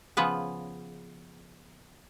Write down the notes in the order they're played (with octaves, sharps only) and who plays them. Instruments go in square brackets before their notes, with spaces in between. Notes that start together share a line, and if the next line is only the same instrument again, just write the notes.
[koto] C#3 F3 B3 G#4 B4